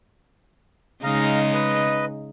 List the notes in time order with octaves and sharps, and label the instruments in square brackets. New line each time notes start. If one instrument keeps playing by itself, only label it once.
[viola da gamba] C#3 G#3 D#4 [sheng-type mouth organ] D#5 F5 A#5
[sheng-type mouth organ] B4 D#5